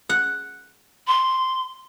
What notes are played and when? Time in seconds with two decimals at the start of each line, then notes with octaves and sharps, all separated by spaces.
0.09 F#5
1.08 C6